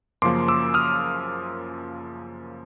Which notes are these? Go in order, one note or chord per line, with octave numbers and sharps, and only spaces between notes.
F#2 C#3 F3 A#3 C6 D6
D6 E6
D#6 F6